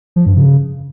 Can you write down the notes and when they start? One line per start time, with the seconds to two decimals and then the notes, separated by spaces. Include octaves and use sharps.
0.16 F3
0.26 G2
0.36 C#3